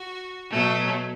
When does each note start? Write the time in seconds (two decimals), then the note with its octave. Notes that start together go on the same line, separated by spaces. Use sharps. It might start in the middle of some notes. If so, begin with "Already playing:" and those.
Already playing: F#4
0.51 B2 F#3 A3